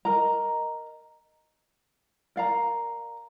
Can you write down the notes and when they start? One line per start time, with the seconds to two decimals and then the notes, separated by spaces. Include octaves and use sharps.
0.05 A#4 D#5 A#5
2.36 A#4 D5 F5 A#5